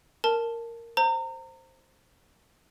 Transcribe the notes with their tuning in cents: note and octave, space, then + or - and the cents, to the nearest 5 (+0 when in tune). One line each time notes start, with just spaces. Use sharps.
A#4 -10 A5 +0
C5 +0 A#5 -30